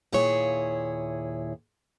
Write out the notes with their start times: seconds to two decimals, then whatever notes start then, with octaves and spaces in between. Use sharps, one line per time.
0.12 D#2 A#2 E4 G#4 C#5